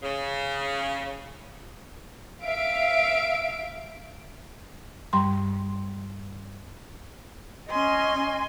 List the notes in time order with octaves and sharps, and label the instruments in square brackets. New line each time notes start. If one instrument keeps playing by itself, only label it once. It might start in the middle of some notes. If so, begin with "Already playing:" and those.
[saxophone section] C#3
[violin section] E5 F5 D7
[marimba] G2 G3 C6
[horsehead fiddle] C#4 D#5 [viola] G#5 C6